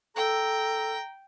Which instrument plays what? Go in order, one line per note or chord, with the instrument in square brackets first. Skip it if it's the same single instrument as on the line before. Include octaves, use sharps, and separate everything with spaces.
[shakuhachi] A4 [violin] G5 [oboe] A#5